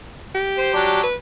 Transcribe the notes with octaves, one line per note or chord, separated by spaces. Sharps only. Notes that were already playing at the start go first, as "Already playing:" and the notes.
G4
C5
F#3 D4
B4